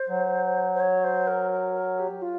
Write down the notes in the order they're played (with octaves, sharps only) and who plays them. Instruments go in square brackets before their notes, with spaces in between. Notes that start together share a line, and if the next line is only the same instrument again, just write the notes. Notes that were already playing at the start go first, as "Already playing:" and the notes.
Already playing: [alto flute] C5
[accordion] F#3
[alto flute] C5
C#5
C5
A#4
A#4
A#4
G4
F4